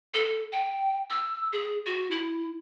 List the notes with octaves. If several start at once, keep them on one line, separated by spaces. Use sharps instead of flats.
A4
G5
E6
G#4
F#4
E4